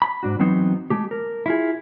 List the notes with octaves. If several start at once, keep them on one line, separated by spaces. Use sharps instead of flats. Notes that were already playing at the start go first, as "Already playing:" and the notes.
B5
G#2 D4 F#4
E3 F#3 B3 C4 D#4
G#3 A3 G4
A#4
E4 F4 G#4